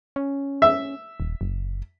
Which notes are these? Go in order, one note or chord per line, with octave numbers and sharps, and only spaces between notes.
C#4
E5
D#1
F#1